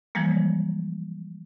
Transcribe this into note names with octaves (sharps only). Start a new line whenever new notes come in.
E3 F3 G3 G#3 A#3